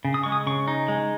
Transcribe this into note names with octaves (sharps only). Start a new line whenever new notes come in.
C#3
D#6
G#3 C#6
D#6
C#3 C#6
D#4
G#3